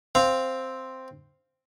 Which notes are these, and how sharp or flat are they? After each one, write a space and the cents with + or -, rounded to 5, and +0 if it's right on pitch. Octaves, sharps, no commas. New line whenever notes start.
C4 +0 F5 +0